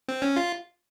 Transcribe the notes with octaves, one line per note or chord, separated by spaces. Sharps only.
C4
C#4
F4